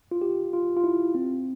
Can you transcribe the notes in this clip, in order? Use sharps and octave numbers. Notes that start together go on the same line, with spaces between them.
F4
G4
F4
F4
E4
C4